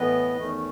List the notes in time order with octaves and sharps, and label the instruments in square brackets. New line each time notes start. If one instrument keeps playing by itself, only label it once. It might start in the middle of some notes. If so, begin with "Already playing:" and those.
Already playing: [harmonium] A2 E3 B3 B4 D#5
E2 D#3 A3 C#4